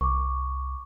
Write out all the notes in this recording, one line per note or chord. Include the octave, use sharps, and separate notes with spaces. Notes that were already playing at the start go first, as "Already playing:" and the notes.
C2 C#6 D6